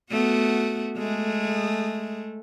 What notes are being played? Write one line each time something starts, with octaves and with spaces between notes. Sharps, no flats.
A3 B3 F#4
G#3 A3